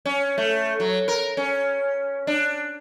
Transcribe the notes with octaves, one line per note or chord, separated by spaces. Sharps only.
C#4
A3
F#3
A#4
C#4
D4